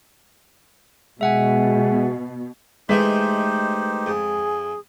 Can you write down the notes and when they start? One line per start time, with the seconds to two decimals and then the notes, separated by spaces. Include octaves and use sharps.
1.21 B2 G#3 E5 F#5 G#5
2.89 E3 G#3 A3 D#4 G4 C5 B6
4.06 F2 G#4